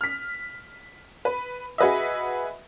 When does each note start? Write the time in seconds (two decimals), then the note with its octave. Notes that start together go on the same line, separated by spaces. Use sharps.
0.01 F6 B6
1.25 B4
1.78 F#4 G#4 B4 D#5 E5